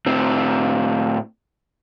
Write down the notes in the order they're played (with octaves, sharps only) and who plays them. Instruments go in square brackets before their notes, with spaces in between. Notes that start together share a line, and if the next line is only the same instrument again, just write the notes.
[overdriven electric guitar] A2 C4